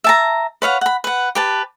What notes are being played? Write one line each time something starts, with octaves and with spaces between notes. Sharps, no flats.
E5 A5 A#5
B4 C#5 F5 F#5
F#5 B5
B4 F#5
G4 B4 A5